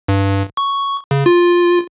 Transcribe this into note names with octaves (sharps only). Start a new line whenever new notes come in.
G2
C#6
C#3
F4